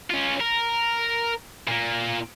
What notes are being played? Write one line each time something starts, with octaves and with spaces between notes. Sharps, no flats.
C#4 F4
A#4
A#2 A#3